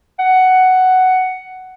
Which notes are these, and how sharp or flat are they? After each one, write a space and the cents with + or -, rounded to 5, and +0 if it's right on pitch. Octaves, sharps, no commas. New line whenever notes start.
F#5 +10